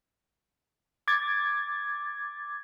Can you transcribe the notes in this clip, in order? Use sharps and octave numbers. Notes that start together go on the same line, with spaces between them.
D6 G#6 A6